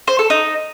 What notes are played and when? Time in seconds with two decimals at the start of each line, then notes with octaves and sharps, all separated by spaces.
0.07 C5
0.19 A4
0.30 D#4